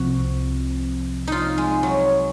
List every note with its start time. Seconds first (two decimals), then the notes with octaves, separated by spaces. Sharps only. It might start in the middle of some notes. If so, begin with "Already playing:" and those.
Already playing: C2 C3 F3 C4 F#4
1.27 D#4 F4
1.58 G#3
1.83 F#3